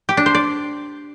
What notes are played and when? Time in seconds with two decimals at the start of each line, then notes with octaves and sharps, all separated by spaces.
0.09 G4
0.17 D4
0.26 C5
0.35 D5